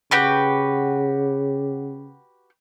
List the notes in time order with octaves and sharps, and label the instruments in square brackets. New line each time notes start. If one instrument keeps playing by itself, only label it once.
[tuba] C#3 [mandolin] F#4 G4 B4